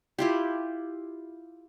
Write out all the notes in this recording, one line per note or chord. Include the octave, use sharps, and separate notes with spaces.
E4 F4 G4